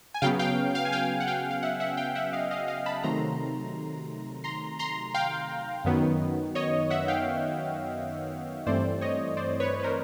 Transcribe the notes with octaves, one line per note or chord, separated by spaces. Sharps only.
G#5
C#3 F#3 B3 F5 G5
F5 G5
F5 G5
G#5
F5 G5
F#5
F5 G5
F5
E5 F#5
E5 F#5
F5 G5
E5 F#5
D#5 F5
D#5 F5
D#5 F5
A5 B5
C3 D#3 F#3 A3 A#5 C6
A#5 C6
A#5 C6
F5 G5
F#2 D#3 F#3 B3
C#5 D#5
E5 F#5
F5 G5
G2 E3 A3 C4 C5 D5
C#5 D#5
C5 D5
B4 C#5
B4
A#4 C5